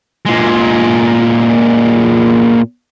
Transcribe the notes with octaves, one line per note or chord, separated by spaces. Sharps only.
A#2 G#3